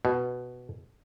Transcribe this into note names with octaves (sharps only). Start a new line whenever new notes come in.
B2